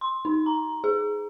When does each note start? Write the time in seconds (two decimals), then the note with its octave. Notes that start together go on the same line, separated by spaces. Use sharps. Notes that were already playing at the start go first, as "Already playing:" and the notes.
0.01 C6
0.25 D#4
0.46 A#5
0.84 G#4